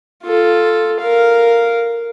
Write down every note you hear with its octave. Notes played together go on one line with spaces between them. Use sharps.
F4 A4
A#4 F5